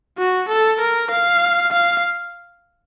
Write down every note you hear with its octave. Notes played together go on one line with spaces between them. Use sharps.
F#4
A4
A#4
F5
F5